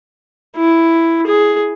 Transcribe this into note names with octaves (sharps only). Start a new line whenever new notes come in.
E4
G#4